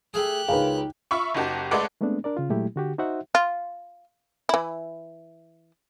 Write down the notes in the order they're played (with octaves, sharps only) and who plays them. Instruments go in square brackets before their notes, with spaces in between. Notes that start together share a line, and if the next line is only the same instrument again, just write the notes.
[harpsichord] A3 G#4 [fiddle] G4 F#6
[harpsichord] C#2 [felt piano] D#4 F5 [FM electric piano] G#4 A#4 B4
[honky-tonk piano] F4 E5 B5 C#6
F#1 D#4 F#4 G4 A5
G#3 A3 A4 B4 D5 F#5
[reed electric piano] G#3 A3 B3 C4 D4
D4 A#4 D5
C#3 F4
A#2 F#3 G#3 A3 E4 G4
D3 F#4 G4
D#4 F#4 C5 E5 F#5
[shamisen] F4
E3 E4